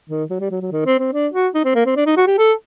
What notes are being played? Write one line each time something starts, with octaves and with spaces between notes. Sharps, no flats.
D#3
F#3
G3
F#3
F#3
D#3
C4
C4
D4
F#4
D#4
C4
A#3
C4
D4
D#4
F#4
G4
A4